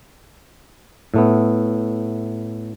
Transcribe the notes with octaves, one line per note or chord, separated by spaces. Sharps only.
A2 A3 B3